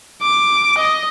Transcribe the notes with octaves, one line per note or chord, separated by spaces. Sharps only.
D6
D#5